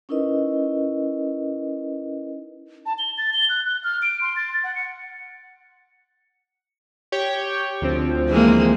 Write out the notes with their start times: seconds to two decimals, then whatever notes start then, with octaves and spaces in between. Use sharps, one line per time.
0.09 C#4 D#4 E4 A#4 B4 D#5
2.86 A5
2.98 G7
3.18 A6
3.34 G7
3.49 F#6
3.65 F#6
3.84 F6
4.02 D7
4.21 C6
4.36 A6
4.64 F#5
4.76 C#7
7.12 G4 C#5 G5
7.82 D2 F3 C4
8.29 E3 G#3 A#3